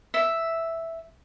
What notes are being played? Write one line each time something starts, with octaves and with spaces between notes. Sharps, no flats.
E5